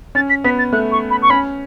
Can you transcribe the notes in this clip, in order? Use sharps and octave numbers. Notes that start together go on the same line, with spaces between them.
C#4 A6
B6
B3 B6
A6
A3 F#6
C#6
B5
C#6
C#4 B5